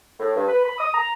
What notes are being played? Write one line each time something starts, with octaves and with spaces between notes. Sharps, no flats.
A2
G2
B4
B5
D#6
A#5